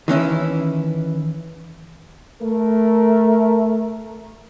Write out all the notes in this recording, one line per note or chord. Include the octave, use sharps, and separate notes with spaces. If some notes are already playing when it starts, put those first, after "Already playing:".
D#3 E3 C#4 E4
A3 A#4